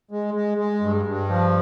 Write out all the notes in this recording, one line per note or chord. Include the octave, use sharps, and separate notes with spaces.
G#3
G#3
G#3
G2
G2
F3